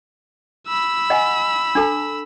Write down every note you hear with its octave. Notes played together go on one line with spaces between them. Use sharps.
B5 E6
D#5 F#5 G#5
D4 A4 A5